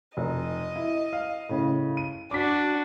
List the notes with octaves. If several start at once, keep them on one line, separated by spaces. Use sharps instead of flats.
F1 D#5
E4
F5
A2 C#3
D#7
D4 F#4 D6 B6